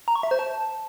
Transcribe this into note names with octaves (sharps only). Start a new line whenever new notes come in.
A#5
C#6
E5
C5
A5